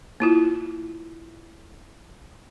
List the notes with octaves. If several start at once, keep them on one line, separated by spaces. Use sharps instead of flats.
A#3 E4 F4